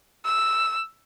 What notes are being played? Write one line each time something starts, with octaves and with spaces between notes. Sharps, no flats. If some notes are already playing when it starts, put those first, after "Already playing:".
E6